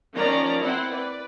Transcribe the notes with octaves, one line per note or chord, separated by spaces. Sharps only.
D#3 F3 C#4 D5 A#5
C4 E4 C5 F#5
B4 D5